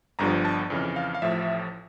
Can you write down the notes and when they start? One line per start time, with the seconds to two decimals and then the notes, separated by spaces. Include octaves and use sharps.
0.19 G1 G2 D3 F3 A#5
0.45 A5
0.70 F2 C#3 E3
0.96 F5
1.15 F5
1.22 A1 A2 F3 E5